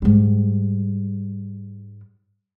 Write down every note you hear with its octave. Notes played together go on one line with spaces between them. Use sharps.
G#2 G3